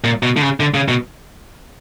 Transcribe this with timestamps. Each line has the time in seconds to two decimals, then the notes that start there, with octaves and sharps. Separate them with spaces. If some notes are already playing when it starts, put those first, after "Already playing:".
0.04 A#2
0.23 B2
0.37 D3
0.42 C#3
0.60 D3
0.74 C#3
0.88 B2